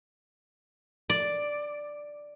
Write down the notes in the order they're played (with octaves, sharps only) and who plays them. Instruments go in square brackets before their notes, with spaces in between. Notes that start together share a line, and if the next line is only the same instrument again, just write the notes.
[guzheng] D5